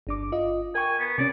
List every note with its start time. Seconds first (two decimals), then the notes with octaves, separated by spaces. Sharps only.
0.07 G1 D4 D6
0.32 F4 D#5
0.75 A#4 G5 G#5 C#6
1.00 B3
1.18 C3 C#4 D5